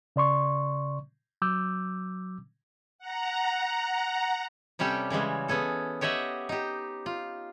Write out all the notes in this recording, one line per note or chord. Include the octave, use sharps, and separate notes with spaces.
C#3 D5 C6 C#6
F#3 D6 E6 G6
F#5 A#5
C3 G3 C#4 G4 A4
C#3 E3 G3 G#3
B3 C#4 G#4 A4
G4 C#5 D#5 E5 F#5
D#4 G4
F4